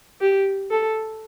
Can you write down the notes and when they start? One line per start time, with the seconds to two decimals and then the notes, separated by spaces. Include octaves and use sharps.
0.21 G4
0.71 A4